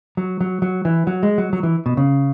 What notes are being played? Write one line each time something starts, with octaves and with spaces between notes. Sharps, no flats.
F#3
F#3
F#3
E3
F#3
G#3
F#3
F#3
E3
B2
C#3